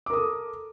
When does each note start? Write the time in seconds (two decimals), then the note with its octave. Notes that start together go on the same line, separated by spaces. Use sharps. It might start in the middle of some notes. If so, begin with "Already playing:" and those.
0.06 D6
0.10 A#4
0.13 D#6
0.17 A4